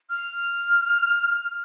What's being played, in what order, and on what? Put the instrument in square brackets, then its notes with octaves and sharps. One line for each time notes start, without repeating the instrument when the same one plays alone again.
[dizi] F6